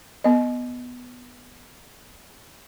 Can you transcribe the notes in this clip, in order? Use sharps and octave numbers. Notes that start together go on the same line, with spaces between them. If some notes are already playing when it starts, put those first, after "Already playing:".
B3 D#5